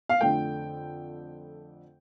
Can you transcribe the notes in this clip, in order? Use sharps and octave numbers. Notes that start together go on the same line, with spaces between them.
F5
F2 D3 A3 G5